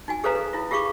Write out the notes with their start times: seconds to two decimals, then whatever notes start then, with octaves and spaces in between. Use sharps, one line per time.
0.08 D#4 F#4 G#5
0.24 G#4 A4 B4 C5 F5 A#5
0.35 A4
0.53 E4 F4
0.71 F4 G4 G#4 F5 C#6 D6